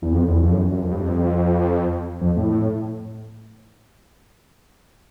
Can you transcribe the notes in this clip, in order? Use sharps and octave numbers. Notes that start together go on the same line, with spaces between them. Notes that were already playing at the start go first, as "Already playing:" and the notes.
E2
F2
E2
F2
F#2
F#2
F2
G2
F2
F2
A2